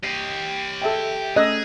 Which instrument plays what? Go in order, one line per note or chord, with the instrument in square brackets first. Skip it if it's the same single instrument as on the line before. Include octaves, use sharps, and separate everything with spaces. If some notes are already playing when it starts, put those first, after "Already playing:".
[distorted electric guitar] G4 D#5 [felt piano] C7
[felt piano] A4 E5 G5
[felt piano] A3 C#4 F#6 [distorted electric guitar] G#4 [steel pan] D#5 E6